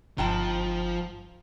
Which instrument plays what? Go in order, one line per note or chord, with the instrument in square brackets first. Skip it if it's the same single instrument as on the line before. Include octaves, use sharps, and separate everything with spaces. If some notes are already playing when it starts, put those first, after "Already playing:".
[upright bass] G1 [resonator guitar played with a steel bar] G#2 G5 A5 [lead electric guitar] F3